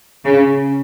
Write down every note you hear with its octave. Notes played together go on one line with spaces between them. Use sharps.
C#3